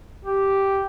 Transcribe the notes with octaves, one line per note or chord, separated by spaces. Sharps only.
G4